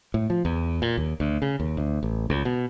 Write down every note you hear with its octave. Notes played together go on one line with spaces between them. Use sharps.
A2
F3
E2
A#2
D#2
D2
C#3
D#2
D2
A1
C#2
B2